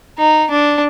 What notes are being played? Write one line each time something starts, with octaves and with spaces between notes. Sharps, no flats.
D#4
D4